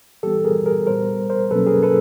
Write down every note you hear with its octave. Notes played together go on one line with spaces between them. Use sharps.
E3 G3 B3 G4 A4
G#4 A#4
G#4 A#4
A#2 G3 B3 A#4 C5
A#4 C5
B2 F#3 A#3 C#4 A4 B4
G#4 A#4
A4 B4